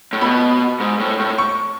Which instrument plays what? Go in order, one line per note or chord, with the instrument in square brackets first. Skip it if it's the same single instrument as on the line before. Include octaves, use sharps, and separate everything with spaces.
[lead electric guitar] A2
[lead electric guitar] B2 [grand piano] B5
[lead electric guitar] G#2
A2
A2
[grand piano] C#6